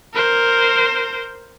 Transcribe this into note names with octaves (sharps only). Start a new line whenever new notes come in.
A#4 C5